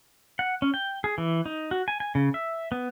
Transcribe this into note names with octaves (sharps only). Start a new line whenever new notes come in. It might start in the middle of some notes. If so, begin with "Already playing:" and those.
F#5
C#4
G5
G#4
E3
D#4
F#4
G#5
G#5
C#3
E5
B3